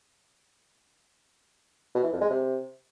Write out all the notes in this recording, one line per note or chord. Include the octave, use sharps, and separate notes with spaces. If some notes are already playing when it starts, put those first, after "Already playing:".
B2
E3
F2
G#3
C3